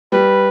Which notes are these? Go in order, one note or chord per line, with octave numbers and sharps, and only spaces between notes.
G3 B4